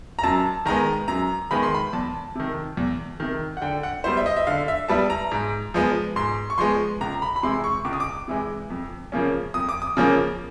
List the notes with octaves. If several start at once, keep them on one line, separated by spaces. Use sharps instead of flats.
A#5
F#2 A5
D#3 G#3 B3 A#5
F#2 A#5
D#3 G#3 B3 B5
C6
B5
E2 A5
C3 D#3
E2
C3 D#3
F#5
D3 G5
F#5
G3 B3 E4 C5
E5
D#5
E5
D3 F5
E5
G3 B3 E4 A5
A#5
G#2
F3 G#3 B3
G#2 C6
C#6
F3 G#3 B3 C6
C#2 A#5
B5
B5
C3 E3 G#3 C6
C#6
C#2 D6
D#6
D6
C3 E3 G#3
F2
C#3 F3 A#3 C#4
F2 D#6
D6
D#6
C#3 F3 A#3 C#4